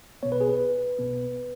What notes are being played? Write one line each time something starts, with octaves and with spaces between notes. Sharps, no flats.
B1 B2 B3 C#5
B4
G#4
B4
B1 B2 B3